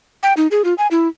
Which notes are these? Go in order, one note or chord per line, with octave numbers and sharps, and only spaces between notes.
G5
D#4
G#4
F4
G#5
E4